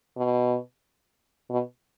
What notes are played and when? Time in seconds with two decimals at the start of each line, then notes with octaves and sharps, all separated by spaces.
0.17 B2
1.50 B2